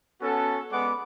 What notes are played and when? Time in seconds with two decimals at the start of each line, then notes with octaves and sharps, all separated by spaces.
0.21 B3 C#4 F#4 A4
0.71 G#3 B3 D5 F#5 D6